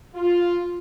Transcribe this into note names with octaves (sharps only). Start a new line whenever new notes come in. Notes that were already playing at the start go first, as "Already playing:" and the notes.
F4